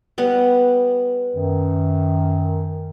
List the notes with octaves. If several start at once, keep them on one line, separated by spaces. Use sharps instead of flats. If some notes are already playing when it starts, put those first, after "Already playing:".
G3 B3 F#5
F#2 D#3